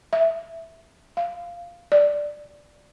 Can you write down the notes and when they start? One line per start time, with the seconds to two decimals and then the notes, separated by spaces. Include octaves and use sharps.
0.13 E5
1.17 F5
1.92 D5